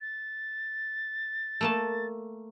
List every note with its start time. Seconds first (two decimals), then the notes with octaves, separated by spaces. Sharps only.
0.01 A6
1.61 A3 A#3 A5